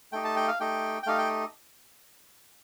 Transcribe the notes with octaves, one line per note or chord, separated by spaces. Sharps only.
A3 D#4 G4 G5
A5
G5
F5
A3 D#4 G4 G5
G5
A3 D#4 G4 F5
G5